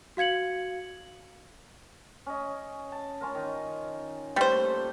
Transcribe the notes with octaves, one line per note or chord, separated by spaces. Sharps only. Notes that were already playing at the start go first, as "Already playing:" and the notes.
F#4 F5 G#6 C#7 F#7
C#4 D#5
A5
C#4 F4 A#4
D#3
A#2 G3 A3 B4 C5